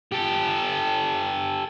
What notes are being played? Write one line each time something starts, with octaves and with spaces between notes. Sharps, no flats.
G4 A4